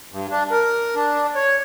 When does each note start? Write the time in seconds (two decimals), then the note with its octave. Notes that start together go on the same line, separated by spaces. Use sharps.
0.12 G2
0.30 D4
0.51 A#4
0.95 D4
1.35 C#5